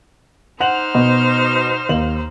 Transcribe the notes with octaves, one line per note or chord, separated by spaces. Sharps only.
D#4 C5 F#5 F6 F7 F#7
B2
D#2 F#7